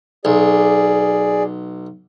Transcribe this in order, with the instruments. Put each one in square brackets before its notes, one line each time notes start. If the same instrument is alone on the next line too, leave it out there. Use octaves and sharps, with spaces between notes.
[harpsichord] B1 [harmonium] G#4 D5